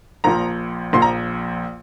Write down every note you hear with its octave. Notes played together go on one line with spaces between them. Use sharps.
A#1 A#2 F3 A#5
A#1 A#2 F3 C6
A#5